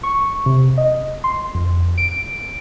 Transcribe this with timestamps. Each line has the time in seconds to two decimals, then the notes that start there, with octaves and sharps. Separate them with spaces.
0.03 C#6
0.46 C3
0.78 D#5
1.24 C6
1.55 F2
1.98 D7